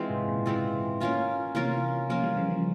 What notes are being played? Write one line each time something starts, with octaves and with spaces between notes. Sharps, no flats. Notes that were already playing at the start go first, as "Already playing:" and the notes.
Already playing: E3 G#3 C4 F4
G#2 C3
A#2 C#3
E3 G#3 C4 F4
A#3 C#4 F4 A#4
C3 E3 A#3 C#4 F4 A#4
C#3 F3 A#3 C#4 F4 A#4
E3 G3
C#3 F3
C#3 F3